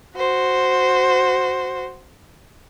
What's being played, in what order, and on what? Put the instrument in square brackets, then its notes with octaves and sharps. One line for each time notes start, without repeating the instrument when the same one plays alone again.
[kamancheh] F#4 C5